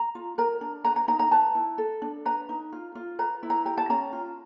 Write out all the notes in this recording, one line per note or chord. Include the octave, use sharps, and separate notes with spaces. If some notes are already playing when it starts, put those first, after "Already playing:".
Already playing: A#5
F4
A#4 A#5
D4
B4 A#5
A#5
D#4 A#5
A#5
B4 A5
E4
A4
D4
B4 A#5
D#4
F4
F4
B4 A#5
E4
A#5
G4 A#5
A5
C#4 A#5
F4